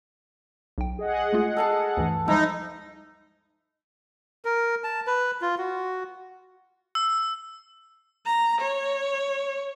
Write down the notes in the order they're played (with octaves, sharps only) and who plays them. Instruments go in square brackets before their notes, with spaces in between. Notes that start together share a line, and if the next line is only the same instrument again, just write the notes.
[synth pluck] B1 G5
[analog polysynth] G#4 D#5 F#5
[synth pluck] G#3 A3 F4
[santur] A4 F5 A5
[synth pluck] D2 G2 E3
[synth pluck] F3 G3 G#3 [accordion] D#4 [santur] E4
[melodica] A#4
A5
B4
F4
F#4
[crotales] E6
[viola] A#5
C#5